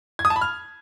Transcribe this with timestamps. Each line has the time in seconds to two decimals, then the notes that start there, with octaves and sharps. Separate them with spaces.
0.19 G#6
0.25 D#6
0.30 A5
0.36 B5
0.41 F6